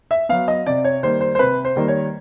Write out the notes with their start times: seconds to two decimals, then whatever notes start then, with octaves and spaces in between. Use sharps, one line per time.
0.11 E5
0.29 F#3 B3 F5
0.48 D#5
0.66 C3 D5
0.84 C#5
1.03 D#3 G3 A#3 C5
1.21 C5
1.35 C5
1.39 C3 B4
1.65 C5
1.76 D#3 G3 A#3
1.88 C#5